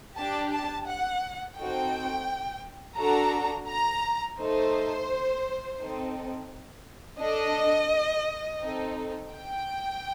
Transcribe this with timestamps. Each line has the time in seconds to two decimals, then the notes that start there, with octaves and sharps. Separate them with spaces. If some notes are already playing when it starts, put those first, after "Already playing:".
0.16 D4 G4 A5
0.52 A5
0.87 F#5
1.57 C4 D#4 F#4 A4 G5
2.98 D4 F#4 A4 A#5
3.68 A#5
4.39 A3 D#4 A4 C5
5.79 C4 D#4 A4
7.20 D4 A4 D#5
8.61 C4 D#4 A4
9.32 G5